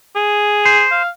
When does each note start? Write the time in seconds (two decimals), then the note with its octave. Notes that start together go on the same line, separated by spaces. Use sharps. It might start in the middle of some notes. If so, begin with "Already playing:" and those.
0.16 G#4
0.65 C5
0.92 F5